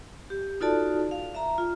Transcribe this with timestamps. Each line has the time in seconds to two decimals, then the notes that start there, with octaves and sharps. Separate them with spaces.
0.30 G4
0.61 D#4 F4 F#4 A4 D5 A5
1.11 F5
1.35 E5 A#5
1.58 F4